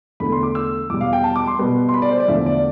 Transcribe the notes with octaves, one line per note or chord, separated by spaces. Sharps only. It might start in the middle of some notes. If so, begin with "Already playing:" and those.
E2 D3 A3 B5
C6
D6
E6
E2 B2 G3 D6
F5
G5
A5
D6
C6
B2 G3 B3
C6
B5
D5
C5
D5
E2 D3 F3 A3 E5
D5